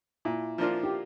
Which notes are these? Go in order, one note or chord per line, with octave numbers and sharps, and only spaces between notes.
A#2 E4
F3 A#3 D4 F4
G4